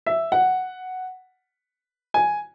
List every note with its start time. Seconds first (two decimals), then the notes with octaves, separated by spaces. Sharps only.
0.06 E5
0.32 F#5
2.14 G#5